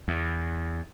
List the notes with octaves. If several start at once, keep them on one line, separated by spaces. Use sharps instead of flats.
E2